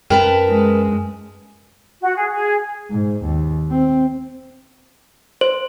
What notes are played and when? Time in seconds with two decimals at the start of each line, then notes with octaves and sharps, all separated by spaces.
0.10 F#2 A#4 B4 G5 A5
0.50 G#3
2.01 F#4
2.16 G#4
2.31 G#4
2.91 G#2
3.25 D#2
3.70 C4
5.41 C5